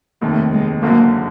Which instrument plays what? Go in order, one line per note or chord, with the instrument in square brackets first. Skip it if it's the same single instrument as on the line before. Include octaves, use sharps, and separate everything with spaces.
[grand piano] F1 D#2 D#3 [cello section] A3
[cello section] G#3
[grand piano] F#1 F#2 D3 F#3 [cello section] A#3